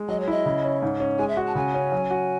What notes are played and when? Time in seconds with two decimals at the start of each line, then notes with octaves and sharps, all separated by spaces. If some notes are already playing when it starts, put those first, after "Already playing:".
Already playing: G#3
0.09 F#3 D#5
0.20 C#5
0.28 E4 D#5
0.46 C#3
0.64 C#4
0.83 G#2
1.00 C#4
1.19 G#3 G#5
1.28 E5
1.37 F#4
1.47 A5
1.55 C#3 G#5
1.74 C#4
1.92 F#3
2.11 F#4